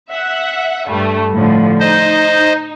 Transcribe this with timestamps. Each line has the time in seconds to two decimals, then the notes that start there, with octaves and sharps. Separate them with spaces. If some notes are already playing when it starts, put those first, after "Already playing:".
0.10 E5 F#5
0.88 G2 G3 A3
1.32 A2 D3 F3
1.80 D#4 C5 D#5